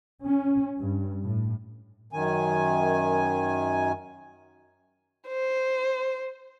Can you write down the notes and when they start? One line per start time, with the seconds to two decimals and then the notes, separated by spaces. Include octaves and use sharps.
0.23 C#4
0.78 G2
1.25 A2
2.13 F#2 D#3 G#5
5.28 C5